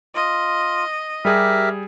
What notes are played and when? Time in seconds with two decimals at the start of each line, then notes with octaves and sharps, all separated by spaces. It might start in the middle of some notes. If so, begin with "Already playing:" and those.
0.15 F4 D#5
1.25 G3 G4 G#4 A#4 E5